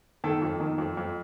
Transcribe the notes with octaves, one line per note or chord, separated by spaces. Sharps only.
D#3 A4
F2
D#3
F2
F2